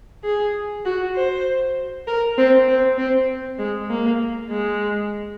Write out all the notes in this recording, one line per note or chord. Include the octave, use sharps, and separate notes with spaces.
G#4
F#4
C5
A#4
C4
C4
C4
G#3
A#3
G#3